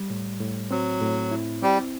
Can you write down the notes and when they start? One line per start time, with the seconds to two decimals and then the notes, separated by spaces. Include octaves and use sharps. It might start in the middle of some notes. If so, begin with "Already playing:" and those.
Already playing: G3
0.10 A2
0.40 A2
0.71 F#3 C4
1.01 A2
1.31 E4
1.62 G3 C4